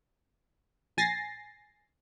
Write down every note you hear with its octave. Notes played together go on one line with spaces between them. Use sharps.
A#1 G#5 A6 A#6 C7